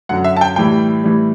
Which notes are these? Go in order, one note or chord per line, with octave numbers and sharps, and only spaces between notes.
F#2 D3 F#3 F#5
E5
A5
G5
A2 E3 G3 G5
A2 E3 G3